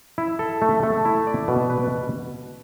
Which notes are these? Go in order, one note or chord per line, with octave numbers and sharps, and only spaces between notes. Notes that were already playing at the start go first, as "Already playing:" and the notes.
E4
A4
A3
A3
E4
D5
B2
B4